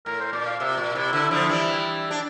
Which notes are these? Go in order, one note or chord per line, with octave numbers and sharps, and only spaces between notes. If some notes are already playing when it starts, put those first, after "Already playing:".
A2 A#4
C5
A#2 D5
F5
C3 E5
A#2
C3 E4
D3
D3 F3
E3 G3
D4